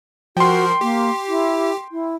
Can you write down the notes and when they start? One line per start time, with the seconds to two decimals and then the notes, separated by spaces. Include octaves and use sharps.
0.37 F3 F#4 A#4 G5 C6
0.81 A#3 G4
1.28 E4
1.92 E4